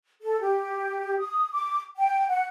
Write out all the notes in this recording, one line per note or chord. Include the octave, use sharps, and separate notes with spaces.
A4
G4
D#6
D6
G5
F#5